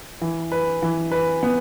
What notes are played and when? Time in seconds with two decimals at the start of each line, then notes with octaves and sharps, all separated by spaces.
0.21 E3
0.52 B4
0.82 E3
1.11 B4
1.43 B3